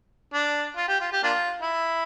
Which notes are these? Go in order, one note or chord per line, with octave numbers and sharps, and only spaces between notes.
D4
F4
G4
F4
G4
A#3 D4 F4
E4